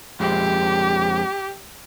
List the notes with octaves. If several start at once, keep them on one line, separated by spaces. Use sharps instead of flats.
F2 G#3 C4 G4